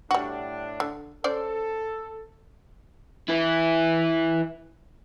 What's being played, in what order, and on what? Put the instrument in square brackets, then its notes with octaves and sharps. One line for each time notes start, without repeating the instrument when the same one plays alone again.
[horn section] A2 D4 [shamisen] G3 F#4
[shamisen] D3
[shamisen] C#4 C5 D5 [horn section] A4
[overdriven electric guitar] E4 B4